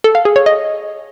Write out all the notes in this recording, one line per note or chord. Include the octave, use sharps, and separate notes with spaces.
A4
F5
G#4
C#5
D#5